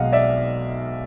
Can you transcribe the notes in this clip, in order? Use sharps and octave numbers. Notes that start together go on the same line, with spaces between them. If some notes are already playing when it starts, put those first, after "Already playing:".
Already playing: B1 B2 G#3 D#5 F5 F#5
D5 E5